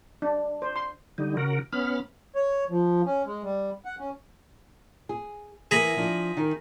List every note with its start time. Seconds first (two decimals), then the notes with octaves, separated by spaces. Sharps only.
0.22 D4
0.62 C5
0.76 C6
1.18 D3 G3 D#4
1.37 C#3 F#4 A#4
1.73 B3 C#4 B5 F6
2.35 C#5
2.70 F3
3.06 C#4
3.26 G#3
3.43 G3
3.85 F#5
3.99 C#4
5.09 G#4
5.71 E3 A#3 G#4 A#5 B5
5.97 F3 D4
6.37 D#3 D#4 A#4